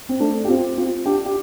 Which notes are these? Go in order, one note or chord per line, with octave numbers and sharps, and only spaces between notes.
C4
A3 D4
G4
C4 F4
C4 F4
D4 G4
G4